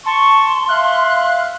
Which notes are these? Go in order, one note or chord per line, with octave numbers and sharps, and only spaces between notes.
A5 C6 C#6
E5 F5 F#6